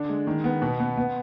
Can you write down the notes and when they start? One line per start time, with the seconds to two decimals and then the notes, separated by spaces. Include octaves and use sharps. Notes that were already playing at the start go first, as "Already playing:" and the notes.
Already playing: D3 D4
0.09 G#3
0.27 D#3
0.44 B3
0.62 B2
0.80 B3
0.97 B3